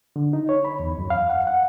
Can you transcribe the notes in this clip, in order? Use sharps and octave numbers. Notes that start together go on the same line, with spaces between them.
D3
D#4
C#5
B5
E2
F#2
F5
F#5
F#5